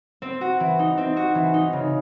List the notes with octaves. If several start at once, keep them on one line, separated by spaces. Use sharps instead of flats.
C4
F#4
E3
D#4
C4
F#4
E3
D#4
C#3